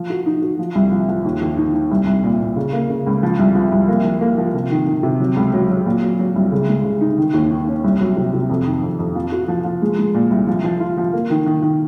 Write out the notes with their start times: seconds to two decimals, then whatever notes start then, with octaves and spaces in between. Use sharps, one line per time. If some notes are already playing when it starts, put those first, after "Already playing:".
Already playing: F3
0.10 F#4
0.26 D#4
0.42 F#4
0.59 F3
0.75 C2
0.92 F3
1.08 F3
1.24 D#2
1.41 D#2
1.57 D#4
1.74 D#4
1.91 C2
2.06 C2
2.24 A#2
2.40 A#2
2.56 C#3
2.73 A#3
2.89 C#3
3.06 C#2
3.23 F3
3.39 C2
3.55 F3
3.72 C2
3.88 A#3
4.04 F3
4.21 A#3
4.38 F3
4.54 C3
4.71 D#3
4.87 D#3
5.03 C3
5.20 F#3
5.36 C#2
5.54 F#3
5.70 F#3
5.86 A#2
6.02 F#3
6.19 F#3
6.36 C2
6.52 C#3
6.69 G#3
6.84 C#3
7.01 D#4
7.18 D#3
7.34 D#2
7.51 D#3
7.67 C#4
7.84 C2
8.01 F#3
8.16 C3
8.33 C3
8.50 F2
8.66 D#3
8.83 F2
8.99 F2
9.15 F3
9.32 F#4
9.48 F3
9.64 F3
9.82 G#3
9.99 G#3
10.14 A#2
10.31 C2
10.47 F3
10.64 F3
10.80 F4
10.97 F3
11.13 A#3
11.30 D#3
11.46 D#3
11.63 D#3